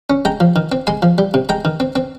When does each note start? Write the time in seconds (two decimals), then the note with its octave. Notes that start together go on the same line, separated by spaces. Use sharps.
0.10 C#4
0.25 G#3 G5 A#5
0.40 F3
0.56 D#3
0.72 C4
0.87 G#3 G#5 C6
1.02 F3
1.18 G3
1.34 C3
1.49 G#3 G5 A#5
1.65 D#3
1.80 C4
1.96 C4